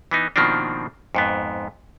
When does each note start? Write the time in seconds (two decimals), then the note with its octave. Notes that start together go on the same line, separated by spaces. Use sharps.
0.11 E3 B3 D#4
0.36 B2 D#3 F3 A#3 C4 D4
1.15 F2 G#2 B3